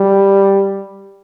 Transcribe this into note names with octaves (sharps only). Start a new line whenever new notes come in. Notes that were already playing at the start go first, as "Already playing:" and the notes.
Already playing: G3